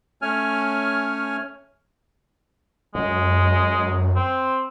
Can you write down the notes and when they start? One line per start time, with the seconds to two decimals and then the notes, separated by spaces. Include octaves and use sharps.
0.22 A3 C#4 C#5 G#5 F6
2.95 F#2 G#3
4.16 C4